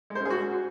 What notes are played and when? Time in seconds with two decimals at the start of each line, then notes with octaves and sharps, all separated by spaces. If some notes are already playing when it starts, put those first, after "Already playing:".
0.10 G#3
0.15 C5
0.20 C#4
0.25 G#4
0.30 F#4